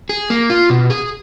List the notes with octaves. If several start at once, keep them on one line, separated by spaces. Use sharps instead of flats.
G#4
A#3
F4
B2
G#4